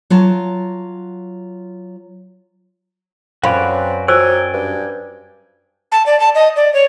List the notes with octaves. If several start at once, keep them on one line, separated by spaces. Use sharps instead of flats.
F#3 F4 A5
F#2 C4 C#4 F#4 B4 D5 F5 B5
F#3 C5 D5 G5 G#5 E6
G2
A5
D5
A5
D#5
D5
C#5